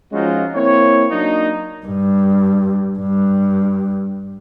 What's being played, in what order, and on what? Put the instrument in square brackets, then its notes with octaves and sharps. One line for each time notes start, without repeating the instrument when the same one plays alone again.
[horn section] F3 G#3 C#4 D#4 F4 F#4
A#3 C4 E4 C#5
F#3 A#3 D4 D#4
[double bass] G2
G2